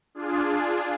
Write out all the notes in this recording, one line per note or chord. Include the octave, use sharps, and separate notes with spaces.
D4 F4 G#4